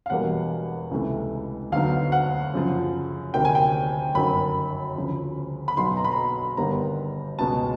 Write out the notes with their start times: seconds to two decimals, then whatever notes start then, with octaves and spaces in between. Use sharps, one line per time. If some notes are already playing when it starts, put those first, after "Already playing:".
0.06 F5
0.10 E1 E2 B2 G3 A#3 F#5
0.91 C#2 C3 E3 A3
1.72 D2 D3 F#3 B3 D#4 F5
2.12 F#5
2.53 F#2 C#3 F3
3.34 D2 C3 D#3 G5
3.45 G#5
3.55 G5
4.15 G1 F#2 D#3 F#3 B5
4.96 D2 C#3 F3
5.68 B5
5.77 B1 B2 F#3 B3 D#4 C6
5.97 A#5
6.04 B5
6.12 A#5
6.57 G1 G2 D#3 G3 B3 A#5
7.39 C#2 B2 G#3 A5